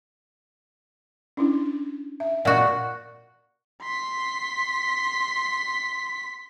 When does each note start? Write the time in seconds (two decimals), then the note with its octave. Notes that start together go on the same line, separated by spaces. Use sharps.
1.37 C#4 D4 E4
2.20 E5
2.45 A#2 F#4 F#5
3.83 C6 B6